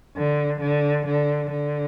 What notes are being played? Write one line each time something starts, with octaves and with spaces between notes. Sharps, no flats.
D3
D3
D3
D3